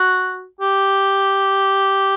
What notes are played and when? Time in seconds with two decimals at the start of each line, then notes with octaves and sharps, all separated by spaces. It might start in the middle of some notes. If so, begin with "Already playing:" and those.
Already playing: F#4
0.61 G4